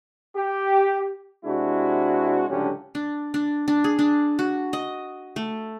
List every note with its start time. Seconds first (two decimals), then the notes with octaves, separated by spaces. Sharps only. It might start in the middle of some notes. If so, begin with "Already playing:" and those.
0.35 G4
1.45 C3 G#3 D4 E4 F#4
2.49 C#2 A2 D3 F#3 C#4 G4
2.95 D4
3.34 D4
3.68 D4
3.84 G#4
3.99 D4
4.39 F#4
4.73 D#5
5.36 A3